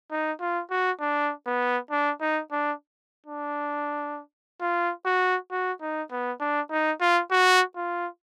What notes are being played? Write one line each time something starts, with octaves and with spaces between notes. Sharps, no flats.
D#4
F4
F#4
D4
B3
D4
D#4
D4
D4
F4
F#4
F#4
D#4
B3
D4
D#4
F4
F#4
F4